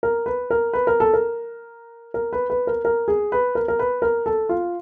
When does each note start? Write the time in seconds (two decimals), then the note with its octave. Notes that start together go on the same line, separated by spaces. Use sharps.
0.03 A#4
0.26 B4
0.50 A#4
0.73 B4
0.87 A#4
1.00 A4
1.13 A#4
2.14 A#4
2.33 B4
2.50 B4
2.67 A#4
2.85 A#4
3.08 G#4
3.32 B4
3.55 A#4
3.68 A#4
3.79 B4
4.02 A#4
4.26 A4
4.49 F4